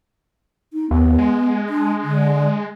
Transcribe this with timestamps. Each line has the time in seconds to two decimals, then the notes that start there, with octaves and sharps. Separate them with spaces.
0.73 D#4
0.91 D#2 B3
1.19 G#3
1.69 D4
2.03 D3